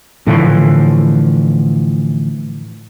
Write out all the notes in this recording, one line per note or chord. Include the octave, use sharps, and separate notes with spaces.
A2 D3 E3 F3